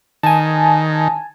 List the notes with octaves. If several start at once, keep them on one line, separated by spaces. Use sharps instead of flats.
D#3 G#5 A5